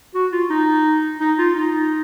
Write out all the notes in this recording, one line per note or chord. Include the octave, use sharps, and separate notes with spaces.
F#4
F4
D#4
D#4
F4
D#4